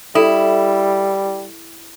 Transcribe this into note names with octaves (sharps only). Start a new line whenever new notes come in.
G3 E4 A4